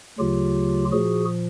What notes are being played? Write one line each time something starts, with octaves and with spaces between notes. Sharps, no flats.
D2 C#3 F#3 F4 G4
A#2 F3 F#4 G#4